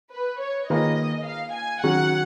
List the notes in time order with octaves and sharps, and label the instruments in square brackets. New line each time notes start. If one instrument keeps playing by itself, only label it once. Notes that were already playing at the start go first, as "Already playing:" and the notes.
[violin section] B4
C#5
[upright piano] D#3 A#3 F4 G#4 B4 [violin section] D#5
[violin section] F5
G#5
[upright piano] D#3 F#3 C#4 F#4 C#5 [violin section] F#5